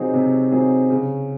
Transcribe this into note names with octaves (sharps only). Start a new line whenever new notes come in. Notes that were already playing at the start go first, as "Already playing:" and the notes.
Already playing: C3 F#3 C4 D#4 G#4
C3
F#3 C4 D#4 G#4
C#3